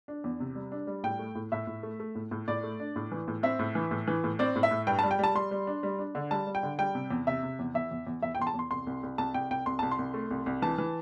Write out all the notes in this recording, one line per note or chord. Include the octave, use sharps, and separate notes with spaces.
D4
E2
C3
G3
D4
G3
A2 G5
A3
A2
A2 E5
A2
A3
A3
A2
A2
A2 D5
A3
D4
A2
E3
A2
C4 E5
A2
E3
A2
E3
A2
C4 D5
A2
E5
A2
G2 G5
A5
G3
G5
G3 A5
G3 C6
G3
D4
G3
D4
D3
G3 A5
G3
G5
D3
G3 G5
C3
E2
C3 E5
C3
E2
E2 E5
E2
E2
E2 E5
G5
E2 C6
A5
E2 C6
C2 C6
C2
C2
C2 A5
C2 G5
C2 G5
C2 C6
C2 A5
C6
C2
A3
C2
C2
E3 A5
E3